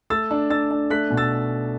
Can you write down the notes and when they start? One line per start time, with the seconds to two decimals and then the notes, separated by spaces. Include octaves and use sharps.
0.10 A3 E6 A6
0.31 D4
0.50 D4 E6 A6
0.71 D4
0.90 A3 F#6 B6
1.10 B2
1.17 E6 A6